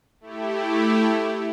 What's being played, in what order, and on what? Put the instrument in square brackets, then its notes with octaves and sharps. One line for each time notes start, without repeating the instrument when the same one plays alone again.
[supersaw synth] A3 E4 G4